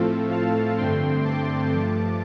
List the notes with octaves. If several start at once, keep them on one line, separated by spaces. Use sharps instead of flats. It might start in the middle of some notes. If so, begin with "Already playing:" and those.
Already playing: A2 F3 A3 C4 F4 A4
F5 A5
G2 D3 A3 C4 G5 C6
A5 D6
G2 F3 A3